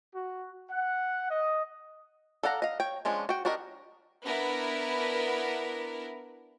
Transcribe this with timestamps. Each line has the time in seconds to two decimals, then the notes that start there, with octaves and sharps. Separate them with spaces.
0.13 F#4
0.70 F#5
1.31 D#5
2.43 A4 D5 F5 F#5 A#5
2.62 D#5 F5
2.80 C#5 G5
3.05 F3 G#3 C#4 D4
3.29 F#4 G5
3.45 D4 F#4 G4 A#4 D#5
4.24 B3 D4 E4 A#4